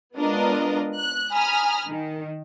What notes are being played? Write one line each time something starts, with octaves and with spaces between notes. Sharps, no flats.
G#3 B3 D4 F4 A#4 D#5
F#6
G#5 A#5 B5 D#6 F6
D#3